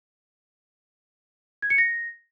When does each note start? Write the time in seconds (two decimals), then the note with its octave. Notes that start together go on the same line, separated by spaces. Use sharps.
1.62 G#6
1.70 C#7
1.78 A#6